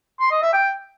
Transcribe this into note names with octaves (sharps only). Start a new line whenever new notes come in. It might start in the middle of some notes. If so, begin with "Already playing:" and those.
C6
D#5
E5
G5